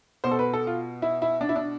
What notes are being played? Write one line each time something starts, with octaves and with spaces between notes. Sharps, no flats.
B2 C5
A4
B4
A4
F4
E4
E4
D4
E4
D4